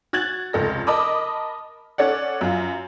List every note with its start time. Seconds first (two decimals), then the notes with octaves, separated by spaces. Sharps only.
0.13 F#4 F#6 G#6 A6 F#7
0.53 F1 C#2 A4 A#6
0.87 A#4 D#5 A5 B5 D6 D#6
1.98 C#4 A4 C#5 D5 F#5
2.41 F#2 F4